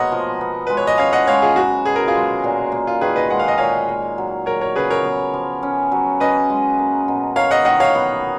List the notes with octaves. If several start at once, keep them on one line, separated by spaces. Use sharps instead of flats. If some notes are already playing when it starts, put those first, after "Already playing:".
Already playing: B2 G#3 A#3 C#5 D#5 F#5
F3
B3
G#3 B4
C#5
D#5
C#4 C#5 F5
D#5 F#5
G#3 C#5 F5
F4 G#4
F#3 F#4
B2 G#4
A#4
F4 G#4
G#3
A#2
A#3
F4
D#3 G#4 B4
B4 D#5
G#3 F#5
F5
D#5
A#2 C#5 F5
A#3
F#3
F#3 A#4 C#5
A#4 C#5
C#3 G#4 B4
A#4 C#5
B3
F3
C#4
F#3
C#4 B4 D#5
G#3
A#3
B2
A#3 C#5 F5
D#5 F#5
D#3 D#5 F#5
C#5 F5
B3